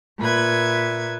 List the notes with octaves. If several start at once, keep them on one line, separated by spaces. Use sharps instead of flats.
A#2 B4 E5 G#6